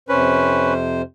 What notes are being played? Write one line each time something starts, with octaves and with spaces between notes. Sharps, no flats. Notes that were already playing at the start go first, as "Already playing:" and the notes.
F2 C3 C#4 B4 C5